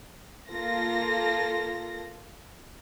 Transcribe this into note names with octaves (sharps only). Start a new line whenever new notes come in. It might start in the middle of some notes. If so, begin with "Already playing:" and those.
A#3 F4 A4 A#6